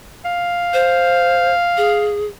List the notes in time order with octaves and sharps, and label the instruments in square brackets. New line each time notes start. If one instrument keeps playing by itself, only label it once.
[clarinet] F5
[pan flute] C5
G#4